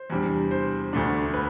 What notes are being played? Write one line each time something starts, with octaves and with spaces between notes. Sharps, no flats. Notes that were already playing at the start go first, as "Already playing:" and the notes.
Already playing: C5
E2 C3 G3 D4
C5
D2 D3 A3 D4
B4